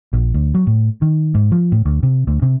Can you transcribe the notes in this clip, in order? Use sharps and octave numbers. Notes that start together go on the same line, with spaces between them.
A#1
D2
F#3
A2
D#3
G#2
F3
A2
D2
C3
D2
C3